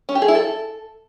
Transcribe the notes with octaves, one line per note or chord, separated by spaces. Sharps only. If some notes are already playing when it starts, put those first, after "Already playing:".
C#4
G4
G#4
E4
A4